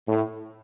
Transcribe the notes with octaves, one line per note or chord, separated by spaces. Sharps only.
A2